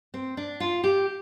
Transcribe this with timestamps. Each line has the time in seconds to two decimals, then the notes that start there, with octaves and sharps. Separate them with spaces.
0.14 C4
0.37 D4
0.60 F4
0.84 G4